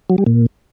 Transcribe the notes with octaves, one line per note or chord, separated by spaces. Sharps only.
F#3
G3
A#2